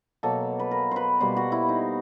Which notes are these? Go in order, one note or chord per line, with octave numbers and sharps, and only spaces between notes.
B2 F#3 A#3 A4
B4
A#4
B4 C5
B2 G3 A#3 C5
F#4
E4
D#4